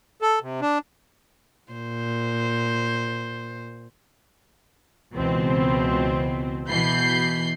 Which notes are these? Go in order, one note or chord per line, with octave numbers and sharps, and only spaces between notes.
A4
C3
D4
A#2 C5
C#2 B2 E3 C4
B2 E3 B5 G6 C7